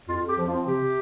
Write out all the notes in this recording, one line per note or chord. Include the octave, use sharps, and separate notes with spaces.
F2 F4
F2
G4
F3
F4
C4
C3 G4
C3